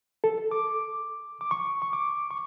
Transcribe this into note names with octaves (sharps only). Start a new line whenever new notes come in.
A4
D6
D6
C#6
C#6
D6
C#6